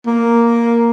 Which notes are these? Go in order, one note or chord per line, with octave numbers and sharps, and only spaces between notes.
A#3